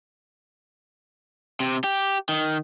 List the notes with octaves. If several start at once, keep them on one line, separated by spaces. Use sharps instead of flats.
C3
G4
D#3